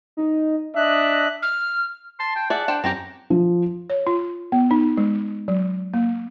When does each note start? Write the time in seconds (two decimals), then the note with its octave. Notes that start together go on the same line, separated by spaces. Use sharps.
0.17 D#4
0.76 D4 D#5 E5 F#6
1.42 F6
2.20 A5 C6
2.36 G5
2.50 G#4 D5 E5 F#5 A5
2.68 D4 C5 G5
2.84 F#2 C4 C#4 G4 A#5
3.30 F3
3.90 C#5
4.07 F4
4.52 B3
4.71 D#4
4.97 G#3
5.48 F#3
5.94 A#3